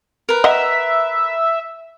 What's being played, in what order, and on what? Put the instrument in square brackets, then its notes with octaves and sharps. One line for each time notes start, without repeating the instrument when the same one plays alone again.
[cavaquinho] A#4 B4
[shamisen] D#5 F#5 [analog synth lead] E5